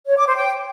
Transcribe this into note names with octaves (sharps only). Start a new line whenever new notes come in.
C#5
D6
C5
G5